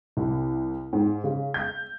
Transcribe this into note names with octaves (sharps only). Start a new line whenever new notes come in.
C2
G#2
C#3
G6